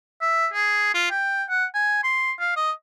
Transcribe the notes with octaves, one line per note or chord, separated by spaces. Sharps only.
E5
G#4
F4
G5
F#5
G#5
C6
F5
D#5